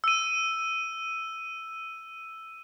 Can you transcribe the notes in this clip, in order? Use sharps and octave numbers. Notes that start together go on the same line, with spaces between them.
E6 D#7